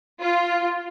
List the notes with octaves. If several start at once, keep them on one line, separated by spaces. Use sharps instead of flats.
F4